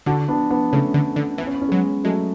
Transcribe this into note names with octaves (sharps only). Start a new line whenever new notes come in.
D3 D4 F#4
B3 D4
B3 D4
C#3 A3 C#4
D3
D3
E3 B3
C#4
B3
C#4
F#3 G#3 B3
F#3 G#3 A3